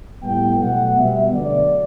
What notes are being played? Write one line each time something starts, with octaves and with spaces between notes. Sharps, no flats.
A2 G3 B3 G5
B2 F#3 A3 F#5
B2 G3 B3 E5
D2 D3 F#3 D5